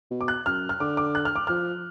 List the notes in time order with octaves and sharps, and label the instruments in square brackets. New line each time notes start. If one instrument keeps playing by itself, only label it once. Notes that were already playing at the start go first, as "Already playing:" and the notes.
[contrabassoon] B2
[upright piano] D6
F#6
[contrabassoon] F#2 [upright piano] F6
[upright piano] F6
[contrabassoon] D3 [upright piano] D6
[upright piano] D6
F#6
F6
D6
[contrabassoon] F3 [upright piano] F6